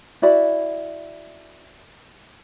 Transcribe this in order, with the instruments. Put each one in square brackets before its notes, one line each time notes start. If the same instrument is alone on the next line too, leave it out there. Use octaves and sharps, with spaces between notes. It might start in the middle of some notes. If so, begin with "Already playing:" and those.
[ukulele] E4 F#4 D5 B5